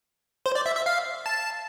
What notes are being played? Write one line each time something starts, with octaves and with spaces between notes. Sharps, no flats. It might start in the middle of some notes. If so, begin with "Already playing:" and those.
C5
D5
E5
E5
F5
A5